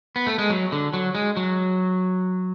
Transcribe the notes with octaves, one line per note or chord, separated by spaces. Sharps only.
B3
A3
G#3
F#3
D3
F#3
G#3
F#3